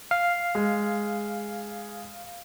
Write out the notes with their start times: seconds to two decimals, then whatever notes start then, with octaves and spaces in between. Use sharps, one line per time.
0.11 F5
0.55 G#3